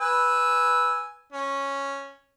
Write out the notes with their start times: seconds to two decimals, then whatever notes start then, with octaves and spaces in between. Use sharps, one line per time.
0.01 B4 G#5 E6
1.32 C#4